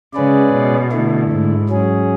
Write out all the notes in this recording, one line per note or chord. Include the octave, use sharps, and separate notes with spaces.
C#3 G#3 C#4 G#4 B4 D5
B2
D3 A3 E4
G#2
F#3 C#4 G#4